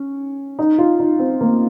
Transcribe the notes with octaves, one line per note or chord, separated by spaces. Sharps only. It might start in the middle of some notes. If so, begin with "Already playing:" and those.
Already playing: C#4
D#4
F4
D#4
C4
A#3